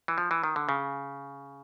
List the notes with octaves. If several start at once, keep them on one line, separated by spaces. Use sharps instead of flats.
E3
F3
E3
D#3
D3
C#3